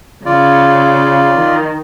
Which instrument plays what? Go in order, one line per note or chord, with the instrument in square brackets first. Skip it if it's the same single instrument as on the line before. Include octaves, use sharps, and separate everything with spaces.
[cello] C#3 [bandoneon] F4 D5
[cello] D#3